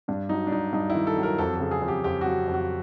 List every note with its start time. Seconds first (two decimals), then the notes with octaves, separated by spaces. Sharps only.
0.08 G2 D4
0.29 F#3 D#4
0.47 D4
0.52 G2 D#4
0.73 G2 D#4
0.90 E4
0.95 D#3
1.07 A4
1.17 F#3
1.23 A#4
1.38 F2 A4
1.55 C#3 A4
1.71 G#4
1.82 F2
1.88 G4
2.04 F2 G4
2.21 F#3 F#4
2.48 F2
2.54 F#4